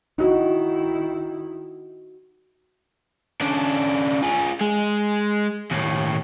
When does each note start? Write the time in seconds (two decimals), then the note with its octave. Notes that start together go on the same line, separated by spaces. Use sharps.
0.18 D#3 D#4 E4 F#4
3.41 C#3 D4
4.23 F4 G#4
4.61 G#3
5.71 D#2 A2